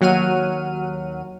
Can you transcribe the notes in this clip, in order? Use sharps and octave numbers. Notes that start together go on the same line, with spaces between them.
D#2 F#3 F#5 F6 D#7